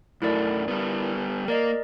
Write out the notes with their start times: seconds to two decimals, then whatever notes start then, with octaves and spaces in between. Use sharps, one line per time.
0.22 F#2 A3 E4 A#4 D5
0.68 G3 B3
1.48 A#3 A#4 D5 D#5